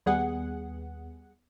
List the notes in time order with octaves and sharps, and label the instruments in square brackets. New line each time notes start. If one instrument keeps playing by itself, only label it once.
[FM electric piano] D#2 B3 [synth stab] G3 G#4 F#5